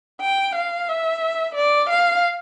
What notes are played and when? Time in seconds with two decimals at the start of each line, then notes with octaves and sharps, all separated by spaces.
0.21 G5
0.55 F5
0.88 E5
1.55 D5
1.89 F5